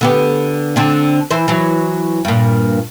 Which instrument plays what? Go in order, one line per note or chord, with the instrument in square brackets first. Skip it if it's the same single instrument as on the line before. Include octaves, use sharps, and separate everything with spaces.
[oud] D3 B3 G4
D3 C4 D4
E3 C5
E3 F#3
G2 A#2